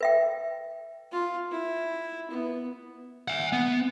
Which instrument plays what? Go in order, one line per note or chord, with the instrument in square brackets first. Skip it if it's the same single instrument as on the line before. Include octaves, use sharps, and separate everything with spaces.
[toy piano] B4 E5 G5
[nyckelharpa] F4
E4
B3
[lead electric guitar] E5 F#5
B3